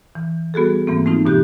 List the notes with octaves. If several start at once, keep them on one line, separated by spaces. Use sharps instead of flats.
E3
G3 B3 F#4 G#4 A4
G#2 E3 A#3 C4
F3 A3 C4 D#4 F4
G2 B2 E3 G4 F#6 G6